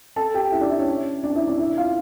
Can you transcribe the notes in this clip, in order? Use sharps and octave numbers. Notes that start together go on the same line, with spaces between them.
A4 A5
G4 G5
E4 E5
D4 D5
E4 E5
C#4 C#5
D4 D5
E4 E5
D4 D5
E4 E5
F4 F5